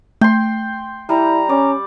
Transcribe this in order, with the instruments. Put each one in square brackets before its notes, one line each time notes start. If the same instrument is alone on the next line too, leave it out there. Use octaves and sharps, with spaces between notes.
[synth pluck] A3 [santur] G5 C6
[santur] G3 [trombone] E4 [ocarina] A#5
[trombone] C#4 [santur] D5